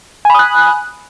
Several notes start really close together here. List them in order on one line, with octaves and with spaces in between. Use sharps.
G#5 B5 D#6 F#6